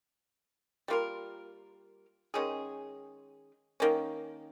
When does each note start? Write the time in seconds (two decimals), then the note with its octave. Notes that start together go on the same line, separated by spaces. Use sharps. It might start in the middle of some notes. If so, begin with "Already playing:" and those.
0.88 G3 A#3 F4 A#4
2.34 D#3 G#3 C#4 G#4
3.80 D#3 A#3 C#4